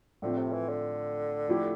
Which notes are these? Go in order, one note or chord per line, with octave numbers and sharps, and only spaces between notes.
A2 D3 F3 A3 C4
C3
E3
D3
F3 A3 E4 G4